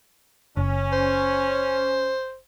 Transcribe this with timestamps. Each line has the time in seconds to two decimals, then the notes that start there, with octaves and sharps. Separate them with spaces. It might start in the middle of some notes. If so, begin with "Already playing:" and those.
0.57 F#1 C#4
0.92 C5